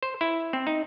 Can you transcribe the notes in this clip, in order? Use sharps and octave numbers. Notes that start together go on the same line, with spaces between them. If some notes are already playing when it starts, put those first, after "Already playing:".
C5
E4
C4
D#4